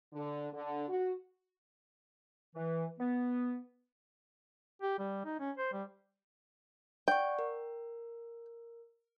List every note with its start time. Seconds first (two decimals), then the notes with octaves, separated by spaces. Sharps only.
0.13 D3
0.53 D3
0.89 F#4
2.55 E3
2.99 B3
4.82 G4
4.99 G3
5.25 D#4
5.40 C#4
5.58 C5
5.73 G3
7.08 D5 F#5 G5 C#6
7.39 A#4